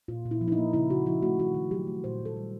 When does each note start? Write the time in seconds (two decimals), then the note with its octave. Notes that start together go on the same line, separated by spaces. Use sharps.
0.08 A#2 F4
0.25 A#2
0.31 E4
0.41 F3
0.48 E4
0.52 D#4
0.58 A#3
0.73 C#3 E4
0.90 C#3 F#4
1.06 F3 E4
1.22 A3 F#4
1.39 D#3 F#4
1.54 D#3
1.71 F#3 G4
1.87 A3
2.04 A#2 C5
2.20 A#2
2.25 A4
2.36 G3